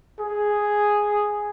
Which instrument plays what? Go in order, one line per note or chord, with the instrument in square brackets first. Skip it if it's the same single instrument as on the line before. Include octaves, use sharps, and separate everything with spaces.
[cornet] G#4